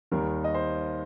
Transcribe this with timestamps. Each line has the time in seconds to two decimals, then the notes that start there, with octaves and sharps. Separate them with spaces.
0.11 D#2 D#3 G3 A#4
0.44 D#5
0.54 C5